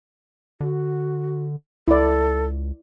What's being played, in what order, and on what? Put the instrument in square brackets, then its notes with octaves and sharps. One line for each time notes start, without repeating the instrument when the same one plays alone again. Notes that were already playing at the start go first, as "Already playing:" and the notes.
[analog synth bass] D3 [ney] F#4
[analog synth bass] C#2 [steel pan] E4 D5 [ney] A4